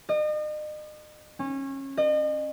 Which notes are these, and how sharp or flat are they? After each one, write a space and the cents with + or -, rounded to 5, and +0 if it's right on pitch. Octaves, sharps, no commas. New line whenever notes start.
D#5 -40
C#4 -25
D#5 -40